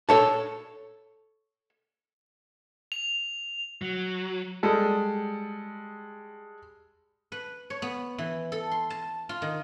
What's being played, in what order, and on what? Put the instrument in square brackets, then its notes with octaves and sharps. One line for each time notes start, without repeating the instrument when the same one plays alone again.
[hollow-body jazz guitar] A4 C#5 A5
[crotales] F7
[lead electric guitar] F#3
[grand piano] G3 G#3 A4
[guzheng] B4
C#5
B3
E3
A4
C6
A5
F4
D#3